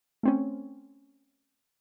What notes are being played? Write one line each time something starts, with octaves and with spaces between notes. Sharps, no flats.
A3 C4 C#4